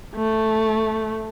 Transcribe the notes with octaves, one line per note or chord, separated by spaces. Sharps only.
A3